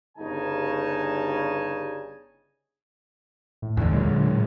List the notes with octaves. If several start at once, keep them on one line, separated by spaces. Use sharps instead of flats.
G1 C#3 G3 D#4 G#5 A5
A2
E2 D3
D#2 A#2 F#3 G#3
D3
A2